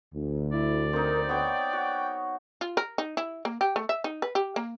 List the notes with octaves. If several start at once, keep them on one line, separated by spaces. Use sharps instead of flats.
D2
E4 D5
C4 D#4 A#4
B3 C#5 G5
F#4
F4
A#4
D#4
E4
A#3
G4
A3
E5
D#4
B4
G4
A#3